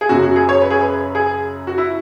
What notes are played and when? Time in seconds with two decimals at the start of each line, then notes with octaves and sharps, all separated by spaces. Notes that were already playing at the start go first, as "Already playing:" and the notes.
0.01 G#4
0.09 F#2 C#3 F#3 F#4
0.23 F#4
0.36 G#4
0.49 C#5
0.62 B4
0.70 G#4
0.80 B4
1.15 G#4
1.67 F#4
1.78 E4